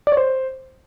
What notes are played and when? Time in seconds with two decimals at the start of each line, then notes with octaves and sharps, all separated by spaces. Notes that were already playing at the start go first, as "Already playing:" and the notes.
0.07 D5
0.12 C#5
0.17 C5